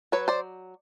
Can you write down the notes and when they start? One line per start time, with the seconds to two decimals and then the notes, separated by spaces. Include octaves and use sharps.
0.12 F#3 B4 C#5
0.28 C5 D5